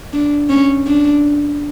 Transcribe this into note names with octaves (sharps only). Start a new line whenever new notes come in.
D4
C#4
D4